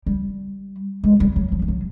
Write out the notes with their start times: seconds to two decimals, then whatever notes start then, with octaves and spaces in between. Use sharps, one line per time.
0.06 G3
1.04 G#3
1.20 G3
1.36 F#3
1.52 F3
1.62 F3
1.68 F#3